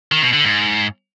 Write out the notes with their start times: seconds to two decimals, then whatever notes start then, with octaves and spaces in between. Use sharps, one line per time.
0.12 D#3
0.22 B2
0.33 D3
0.44 G#2